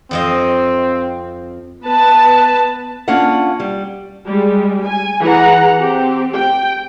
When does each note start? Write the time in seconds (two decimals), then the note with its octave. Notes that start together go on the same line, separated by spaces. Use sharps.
0.11 F2 F3 C4 D#5
1.84 B3 B4 A5
3.08 A#3 C#4 D4 F4 F#5
3.60 G3
4.27 G3 G#3
4.85 G#5
5.21 E3 G#4 F#5 A#5
5.81 C4 G4
6.35 G5